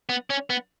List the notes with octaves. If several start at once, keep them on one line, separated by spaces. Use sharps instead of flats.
B3
C#4
B3